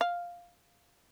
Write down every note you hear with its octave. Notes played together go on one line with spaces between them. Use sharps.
F5